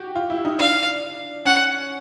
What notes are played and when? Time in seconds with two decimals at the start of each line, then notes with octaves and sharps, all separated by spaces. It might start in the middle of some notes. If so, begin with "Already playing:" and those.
Already playing: F#4 G4
0.15 F4
0.30 E4
0.45 D#4
0.59 D4 F5
1.45 C#4 F#5